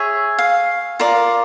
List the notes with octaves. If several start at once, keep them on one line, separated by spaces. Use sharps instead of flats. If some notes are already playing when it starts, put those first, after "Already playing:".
Already playing: G#4 C#5 E5
F5
F4 A#4 D5